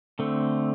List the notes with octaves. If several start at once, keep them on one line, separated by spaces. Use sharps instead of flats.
D3 A3 C4